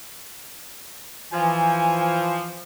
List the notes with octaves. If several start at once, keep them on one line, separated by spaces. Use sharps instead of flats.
E3 F3 G#5